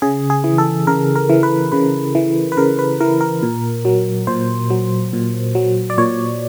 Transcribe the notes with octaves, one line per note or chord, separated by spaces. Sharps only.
C#3 G#4
G#4
E3
A4
C#3 A#4
A#4
E3
B4
C#3 B4
E3
B4
C#3 A#4
B4
E3 A#4
A#4
A#2
F#3
A#2 C5
F#3
A#2
F#3
D5
A#2 C#5